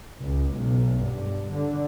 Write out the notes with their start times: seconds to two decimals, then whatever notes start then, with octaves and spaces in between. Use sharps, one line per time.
0.21 C#2
0.54 B1
0.99 G2
1.52 D3